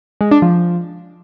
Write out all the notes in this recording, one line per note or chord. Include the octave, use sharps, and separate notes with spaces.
G#3
D4
F3